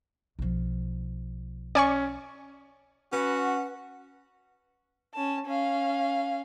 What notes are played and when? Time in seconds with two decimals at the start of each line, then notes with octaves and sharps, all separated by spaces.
0.39 B1 F3
1.75 C#4 D5 G#5 C#6
3.13 C#4 F#4 B4 F#5
5.14 C#4 A5
5.46 C#4 F5